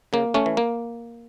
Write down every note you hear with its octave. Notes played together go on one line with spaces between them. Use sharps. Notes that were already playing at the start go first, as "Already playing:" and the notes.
C#3 A#3
A3 C#4
E3
A#3